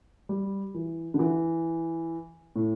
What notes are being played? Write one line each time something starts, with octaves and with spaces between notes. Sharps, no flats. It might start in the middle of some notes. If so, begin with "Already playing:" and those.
G3
E3
D3
E3
A2